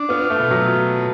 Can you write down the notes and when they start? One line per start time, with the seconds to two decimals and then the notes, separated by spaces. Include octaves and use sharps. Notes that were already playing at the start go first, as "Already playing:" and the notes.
Already playing: D4
0.09 B3 F4
0.30 A3
0.40 B2
0.51 F#3